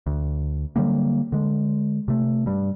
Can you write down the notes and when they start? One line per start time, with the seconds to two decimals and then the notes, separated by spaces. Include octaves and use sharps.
0.06 D2
0.76 D3 F#3 G3 A#3
1.32 D3 G#3
2.08 C3 A3
2.46 G2 G3